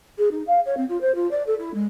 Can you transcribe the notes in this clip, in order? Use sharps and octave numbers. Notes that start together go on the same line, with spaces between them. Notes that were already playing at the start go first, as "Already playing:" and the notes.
G#4
D#4
F5
C#5
C4
F4
C5
F4
D5
A4
E4
G#3